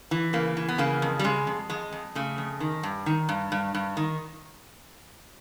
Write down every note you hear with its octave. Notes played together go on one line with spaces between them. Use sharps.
E3
C#3 A#3
E3
B3
C#3 A#3
F2
G3
C#3 G#3
F2
F2 G#3
F2
C#3 A3
F2
D#3
G2
D#3
G2
G2
G2
D#3